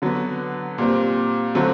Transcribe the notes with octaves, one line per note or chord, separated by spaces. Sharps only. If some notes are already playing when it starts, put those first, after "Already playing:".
D3 F#3 B3
A#2 G3 C4
D3 F#3 A3 C4